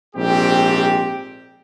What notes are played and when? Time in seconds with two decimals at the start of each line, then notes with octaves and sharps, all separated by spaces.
0.16 A#1 G#2 C4 G4